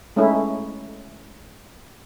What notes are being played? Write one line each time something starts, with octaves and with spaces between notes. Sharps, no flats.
G#3 A3 C#4 D#4 E4